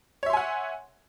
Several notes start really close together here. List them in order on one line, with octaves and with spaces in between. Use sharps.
C#5 E5 C6 G#5 F#5